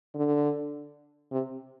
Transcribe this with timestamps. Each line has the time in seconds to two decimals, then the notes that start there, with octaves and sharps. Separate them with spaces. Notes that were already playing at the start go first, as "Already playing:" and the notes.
0.15 D3
1.32 C3